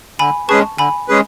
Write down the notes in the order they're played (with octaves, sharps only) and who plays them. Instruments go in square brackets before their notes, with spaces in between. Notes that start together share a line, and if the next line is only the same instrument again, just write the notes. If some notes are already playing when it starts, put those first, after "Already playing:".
[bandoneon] D3 [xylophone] G#5 B5
[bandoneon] G#3 C#4 G#4 B4 [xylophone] A5 C#6
[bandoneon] D3 [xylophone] G#5 B5
[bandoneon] G#3 C#4 G#4 B4